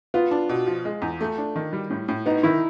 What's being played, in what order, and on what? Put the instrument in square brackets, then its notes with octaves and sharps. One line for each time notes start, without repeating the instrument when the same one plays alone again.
[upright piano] B3 [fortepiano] F4
[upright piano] D4
B2
F3
G#3
E2
A3
D4
D#3
G3
A2
A2
[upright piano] B3 [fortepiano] D#4
[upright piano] D#3 [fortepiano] E4